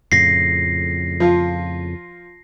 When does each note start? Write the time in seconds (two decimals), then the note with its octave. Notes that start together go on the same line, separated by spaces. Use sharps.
0.12 F2 A2 C#3 A#6 C7
1.20 F3 F4